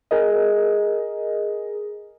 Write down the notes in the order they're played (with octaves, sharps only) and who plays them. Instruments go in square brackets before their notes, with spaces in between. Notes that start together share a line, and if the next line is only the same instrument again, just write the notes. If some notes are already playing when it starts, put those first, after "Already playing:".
[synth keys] G#4 A#4 D#5